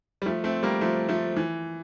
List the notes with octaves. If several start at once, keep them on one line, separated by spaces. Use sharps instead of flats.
G3
F3 A3
A3 C4
G3 A#3
F3 A3
F3 A3
E3